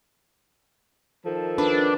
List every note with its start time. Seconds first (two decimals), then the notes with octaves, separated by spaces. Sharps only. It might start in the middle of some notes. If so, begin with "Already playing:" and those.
1.25 D#3 F3 A4
1.58 D4 B4